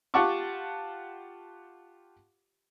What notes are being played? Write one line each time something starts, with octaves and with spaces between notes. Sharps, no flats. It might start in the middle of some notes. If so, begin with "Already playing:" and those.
F4 G4 F#5 A5 C#6 D6